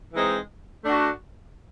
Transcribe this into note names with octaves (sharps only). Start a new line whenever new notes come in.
E3 G#3 C4 D#4
A3 D4 F#4